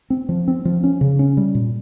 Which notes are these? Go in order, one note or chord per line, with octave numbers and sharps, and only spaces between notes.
C4
F3
C4
F3
C#4
C#3
C#4
G3
A#2